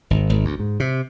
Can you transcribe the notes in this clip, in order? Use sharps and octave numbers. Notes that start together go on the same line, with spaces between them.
G#1
G#1
D2
G#2
C3